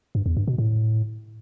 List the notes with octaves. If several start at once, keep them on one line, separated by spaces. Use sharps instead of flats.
G2
E2
G2
B2
A2